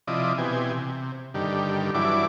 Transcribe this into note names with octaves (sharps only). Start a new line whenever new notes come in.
C3 F3 E4 D5 D#5
B2 E3 C4 G4 G#5
C3
G2 D3 D#3 G4
G2 E3 F#3 D4 E4 D6